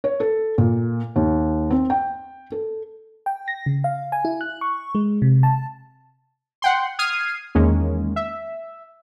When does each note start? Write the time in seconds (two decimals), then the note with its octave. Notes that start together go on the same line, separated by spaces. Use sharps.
0.04 C#5
0.20 A4
0.58 A#2
1.16 D#2
1.71 C4
1.90 G5
2.52 A4
3.26 G5
3.48 A#6
3.66 C#3
3.84 F5
4.12 G#5
4.25 E4
4.41 F#6
4.61 C#6
4.95 G#3
5.22 C3
5.43 A5
6.62 F#5 G5 C6
6.99 D#6 F6 G#6 C7 D#7
7.55 E2 D#3 G#3 A#3 C#4
8.16 E5